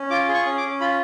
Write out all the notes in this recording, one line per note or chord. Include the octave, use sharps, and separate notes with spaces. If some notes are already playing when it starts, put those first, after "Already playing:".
Already playing: C#4
F4 D6
G#4
C#6
C#4
D6
C#4
F4 B5